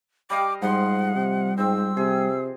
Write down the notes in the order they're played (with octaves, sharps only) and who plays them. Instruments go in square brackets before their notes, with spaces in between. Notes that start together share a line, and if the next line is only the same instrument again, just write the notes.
[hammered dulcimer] G3 D#5 F5 [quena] D6
[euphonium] G#2 [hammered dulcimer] F3 C6 [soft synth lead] G3 [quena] F#5
[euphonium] C3
[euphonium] G#2 [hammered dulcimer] C4 [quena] E6
[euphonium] C3 [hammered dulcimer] G#4